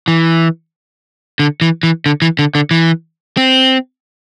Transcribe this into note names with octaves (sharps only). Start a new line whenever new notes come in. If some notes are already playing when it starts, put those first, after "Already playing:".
E3
D3
E3
E3
D3
E3
D3
D3
E3
C4